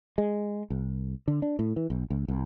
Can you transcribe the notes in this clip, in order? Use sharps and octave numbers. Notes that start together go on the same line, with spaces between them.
G#3
C2
D3
D4
A2
E3
B1
C#2
C2